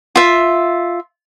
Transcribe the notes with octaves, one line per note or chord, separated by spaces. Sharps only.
F4 E5